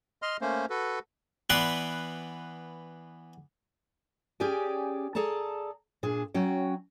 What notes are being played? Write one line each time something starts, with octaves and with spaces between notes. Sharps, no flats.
D#5 C6 F6
A3 A#3 C#4 C5
F#4 A4 B4
E3 B3 B4 D5 C6
C#4 G4 G#4 D5 G5 G#5
G#4 A4 D5 A5 A#5
A#2 D4 G#4
F#3 C#4 F#4 G5